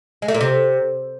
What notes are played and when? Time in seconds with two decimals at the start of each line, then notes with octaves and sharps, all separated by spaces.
0.22 G#3
0.28 A3
0.34 A#2
0.41 C3